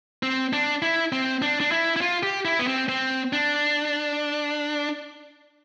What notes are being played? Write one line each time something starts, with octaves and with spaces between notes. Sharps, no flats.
C4
D4
E4
C4
D4
D4
E4
E4
F4
G4
E4
B3
C4
C4
D4